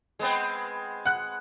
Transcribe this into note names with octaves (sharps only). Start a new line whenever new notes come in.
G#3 B3 C4
F#5 F#6